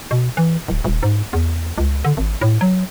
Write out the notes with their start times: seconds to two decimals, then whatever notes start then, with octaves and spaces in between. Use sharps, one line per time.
0.11 B2
0.37 E3
0.68 D1
0.84 D#1
1.03 G#2
1.33 E2
1.78 C#2
2.05 D3
2.17 G#1
2.41 A2
2.61 F#3